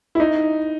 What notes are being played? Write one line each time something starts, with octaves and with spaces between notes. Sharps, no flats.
E4
D#4